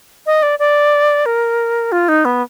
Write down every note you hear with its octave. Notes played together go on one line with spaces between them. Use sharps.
D#5
D5
D5
A#4
F4
D#4
B3